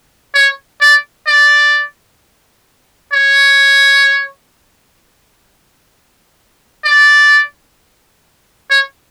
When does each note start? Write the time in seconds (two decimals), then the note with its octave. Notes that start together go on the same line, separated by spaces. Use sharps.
0.34 C#5
0.81 D5
1.27 D5
3.13 C#5
6.84 D5
8.70 C#5